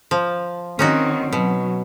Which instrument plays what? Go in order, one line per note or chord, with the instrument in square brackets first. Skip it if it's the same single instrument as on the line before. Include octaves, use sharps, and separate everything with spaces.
[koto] F3
[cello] D#3 C4 [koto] C#4 D#4 F#4
[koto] B2 [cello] F#3